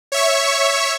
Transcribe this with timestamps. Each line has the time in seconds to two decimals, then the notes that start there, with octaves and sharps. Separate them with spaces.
0.12 C#5 E5 C#6